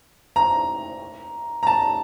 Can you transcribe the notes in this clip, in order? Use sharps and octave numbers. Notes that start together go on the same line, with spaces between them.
A#5
A#5
A5